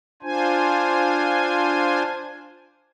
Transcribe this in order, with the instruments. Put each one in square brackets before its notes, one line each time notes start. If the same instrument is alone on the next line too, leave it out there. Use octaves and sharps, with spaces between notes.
[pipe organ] D4 F4 C5 G#5